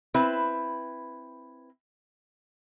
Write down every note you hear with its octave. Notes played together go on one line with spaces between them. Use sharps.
C4 E4 B4